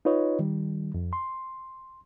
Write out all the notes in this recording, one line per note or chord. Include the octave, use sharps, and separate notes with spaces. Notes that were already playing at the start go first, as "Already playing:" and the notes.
D#4 F4 B4 C#5 D#5
D#3 G3
F2
C6